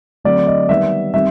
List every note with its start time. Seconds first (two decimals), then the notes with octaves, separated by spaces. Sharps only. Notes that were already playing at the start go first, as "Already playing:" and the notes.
0.24 D3 F#3 A3 C4 D5
0.47 D#5
0.69 D#3 G3 B3 E5
1.14 D#3 G3 C4 E5